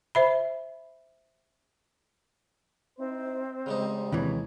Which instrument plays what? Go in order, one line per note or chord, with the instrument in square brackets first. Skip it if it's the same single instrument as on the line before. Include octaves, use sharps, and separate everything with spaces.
[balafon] C5 E5 B5
[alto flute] C4 [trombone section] D#4 E4 C5
[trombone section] A1 G3 C5 [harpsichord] C#3 G#3 D#4
[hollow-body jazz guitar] D#2 C3 E3 [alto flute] C#5